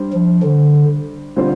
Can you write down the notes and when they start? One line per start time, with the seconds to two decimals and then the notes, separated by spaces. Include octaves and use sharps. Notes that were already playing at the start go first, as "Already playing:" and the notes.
Already playing: G3 D4 C5
0.13 F3
0.43 D3
1.36 D3 G3 C4 F4 C5